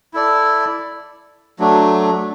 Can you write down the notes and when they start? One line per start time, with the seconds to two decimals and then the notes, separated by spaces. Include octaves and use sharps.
0.14 E4 A4 D5
1.59 F#3 A3 D4